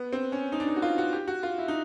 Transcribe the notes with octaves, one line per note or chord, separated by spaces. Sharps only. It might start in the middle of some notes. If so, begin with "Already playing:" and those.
Already playing: B3
C4
C#4
D#4
D4
D#4
F#4
F4
F#4
G4
F#4
F4
E4
D#4